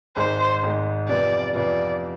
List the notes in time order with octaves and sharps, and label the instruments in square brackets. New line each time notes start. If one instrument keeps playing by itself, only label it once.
[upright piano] G#1 G#2 G#3 [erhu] C5
[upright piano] G#1 G#2 G#3
[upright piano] F2 C3 E3 B3 F4 [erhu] D5
[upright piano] F2 C3 E3 B3 F4 [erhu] D5